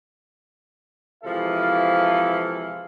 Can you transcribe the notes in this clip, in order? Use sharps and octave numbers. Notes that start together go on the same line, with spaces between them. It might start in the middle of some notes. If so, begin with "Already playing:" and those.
C3 E3 F3 G#3 A4 F5